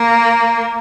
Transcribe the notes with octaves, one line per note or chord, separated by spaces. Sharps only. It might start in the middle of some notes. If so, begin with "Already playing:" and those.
Already playing: A#3